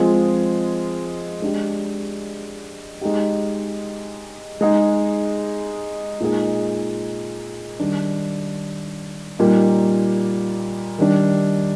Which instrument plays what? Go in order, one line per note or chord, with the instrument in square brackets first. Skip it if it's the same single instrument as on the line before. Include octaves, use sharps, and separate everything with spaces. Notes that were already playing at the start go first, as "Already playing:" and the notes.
Already playing: [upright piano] F3 G#3 C4 F4 G#4
G#3 D4 G4
G#3 D#4 G4
G#3 D#4 G#4
A#2 G#3 D#4 G#4
D#3 G3 D4
A#2 G3 A#3 D#4
D#3 G3 D4